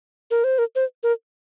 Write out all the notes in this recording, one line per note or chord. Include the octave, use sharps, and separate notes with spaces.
A#4
C5
A#4
C5
A#4